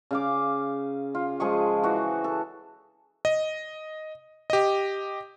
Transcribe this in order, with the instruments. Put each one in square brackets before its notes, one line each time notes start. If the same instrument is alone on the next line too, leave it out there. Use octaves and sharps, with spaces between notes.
[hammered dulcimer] C#3 F5 D6
F4
F3 G#3 G#4 C#6
E3 F#4
A4
[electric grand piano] D#5
G4 D#5